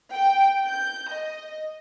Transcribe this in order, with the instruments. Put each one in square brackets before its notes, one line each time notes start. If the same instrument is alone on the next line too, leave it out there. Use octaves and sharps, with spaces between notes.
[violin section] G5
G6
D#5